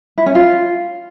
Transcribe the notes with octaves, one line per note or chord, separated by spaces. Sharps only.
E4
C#4
F4